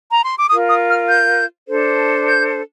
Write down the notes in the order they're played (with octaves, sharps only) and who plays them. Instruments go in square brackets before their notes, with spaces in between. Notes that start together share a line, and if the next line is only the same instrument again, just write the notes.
[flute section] A#5
C6
D6
F4 A#4 D#6
D#6
F6
G6
D4 A4 C5
G6